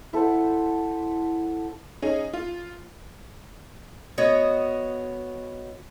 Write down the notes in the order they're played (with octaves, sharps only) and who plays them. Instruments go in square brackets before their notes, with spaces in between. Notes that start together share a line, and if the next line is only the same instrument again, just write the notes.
[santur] E4 A4 C5 F#5
[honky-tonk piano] C#4 D#4 G#4
F4
[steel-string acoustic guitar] B3 F#4 C#5 D#5